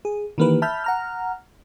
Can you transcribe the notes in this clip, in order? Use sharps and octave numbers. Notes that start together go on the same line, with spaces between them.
G#4
D#3 E3 A#3 G4 B4
E5 A5 B5 F6 G6
F#5 A#5 F6